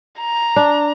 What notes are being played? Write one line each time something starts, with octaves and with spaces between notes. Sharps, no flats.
A#5
D4